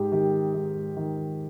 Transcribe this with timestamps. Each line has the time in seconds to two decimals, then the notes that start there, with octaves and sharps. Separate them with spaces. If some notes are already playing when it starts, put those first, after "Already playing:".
Already playing: G#2 G4
0.12 D#3 G4
0.54 G#2
0.97 D#3